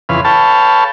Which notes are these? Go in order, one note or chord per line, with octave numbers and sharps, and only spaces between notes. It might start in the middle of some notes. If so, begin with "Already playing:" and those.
F2 C#3 E3 B4 F5
A4 B4 C#5 F5 G5 A5